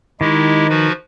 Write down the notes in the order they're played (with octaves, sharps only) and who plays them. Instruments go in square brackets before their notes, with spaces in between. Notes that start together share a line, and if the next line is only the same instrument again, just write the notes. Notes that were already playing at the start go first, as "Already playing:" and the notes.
[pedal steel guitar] D#3 [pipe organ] G#3 E4 G4
[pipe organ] F3 F#4 B4